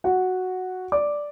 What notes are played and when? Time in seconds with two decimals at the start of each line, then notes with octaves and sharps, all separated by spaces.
0.04 F#4 F#5
0.92 D5 D6